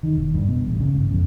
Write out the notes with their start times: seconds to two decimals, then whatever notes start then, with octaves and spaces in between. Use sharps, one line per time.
0.03 D#3
0.15 E1
0.34 G2
0.48 B2
0.66 A1
0.80 C#3
0.94 G#2
1.12 F2